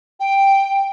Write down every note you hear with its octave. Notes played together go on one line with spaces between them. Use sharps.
G5